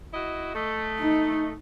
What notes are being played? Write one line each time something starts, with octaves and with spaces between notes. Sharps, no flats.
E4 F#4 D#5
A3 D#5
D#4